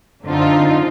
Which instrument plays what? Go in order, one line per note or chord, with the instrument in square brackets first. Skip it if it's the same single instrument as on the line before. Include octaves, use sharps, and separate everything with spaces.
[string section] F#2 D3 C4 D#4 F4